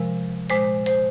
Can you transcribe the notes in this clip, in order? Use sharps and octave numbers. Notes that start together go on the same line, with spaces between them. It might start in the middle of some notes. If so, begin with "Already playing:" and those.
Already playing: C3 F3 G#3 A#4
A#2 G#3 C5
C5